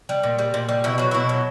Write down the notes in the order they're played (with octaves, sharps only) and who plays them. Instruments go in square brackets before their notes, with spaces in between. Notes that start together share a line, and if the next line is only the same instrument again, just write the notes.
[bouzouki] G3
A#2
G3
A#2
G3
B2 E4
F#3 F#4
B2 E4
F#3